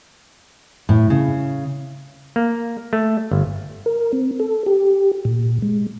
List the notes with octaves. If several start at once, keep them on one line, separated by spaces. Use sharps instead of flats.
A2
C#3
A#3
A3
G1
A#4
C4
A4
G4
A#2
G#3